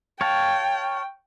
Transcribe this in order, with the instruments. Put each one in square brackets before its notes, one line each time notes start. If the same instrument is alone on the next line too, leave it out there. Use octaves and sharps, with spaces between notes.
[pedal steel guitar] C#5 F5 A5 [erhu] G5